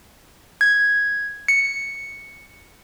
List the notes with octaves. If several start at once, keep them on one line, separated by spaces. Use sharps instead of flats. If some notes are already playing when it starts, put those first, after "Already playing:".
G#6
C#7